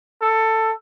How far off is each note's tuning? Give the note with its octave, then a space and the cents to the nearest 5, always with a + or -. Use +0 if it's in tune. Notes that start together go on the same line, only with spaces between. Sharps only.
A4 +15